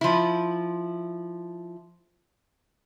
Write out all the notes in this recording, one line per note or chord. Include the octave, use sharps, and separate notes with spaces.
F3 E4